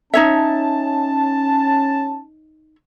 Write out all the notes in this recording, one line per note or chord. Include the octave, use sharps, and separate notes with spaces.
C#4 D#4 C#5 E5 A5